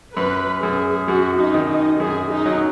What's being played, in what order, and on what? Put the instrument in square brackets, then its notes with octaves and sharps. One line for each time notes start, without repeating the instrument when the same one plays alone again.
[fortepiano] F#2 [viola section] B4
[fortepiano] F#2 [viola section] G#4
[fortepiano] F#2 [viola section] F#4
[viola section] D#4
[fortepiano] D#3
[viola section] D#4
[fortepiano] F#2 [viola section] G#4
[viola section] D#4
[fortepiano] F#3